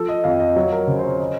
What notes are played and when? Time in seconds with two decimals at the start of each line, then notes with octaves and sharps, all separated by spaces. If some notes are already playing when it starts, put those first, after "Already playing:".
Already playing: F3 A4
0.08 D#5
0.24 F2 F5
0.40 D#5
0.56 F#3 C#5
0.72 A#4
0.87 C#3 C5
0.99 C5
1.03 C#5
1.20 D#5